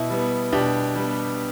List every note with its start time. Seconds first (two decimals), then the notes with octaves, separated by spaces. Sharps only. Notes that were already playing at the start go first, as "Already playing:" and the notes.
Already playing: B2 E4
0.10 G3 B3
0.52 B2 D4 G4
0.95 G3 B3